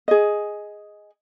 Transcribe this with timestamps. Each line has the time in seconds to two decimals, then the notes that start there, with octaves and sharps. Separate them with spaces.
0.08 G#4 D#5